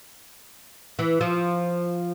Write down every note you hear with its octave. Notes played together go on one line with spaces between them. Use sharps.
E3
F3